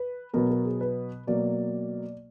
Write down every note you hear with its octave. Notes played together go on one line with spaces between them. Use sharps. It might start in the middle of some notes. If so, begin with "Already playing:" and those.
Already playing: B4
B2 F#3 B3 A#4
A#4
G#4
B4
B2 F#3 A#3 D5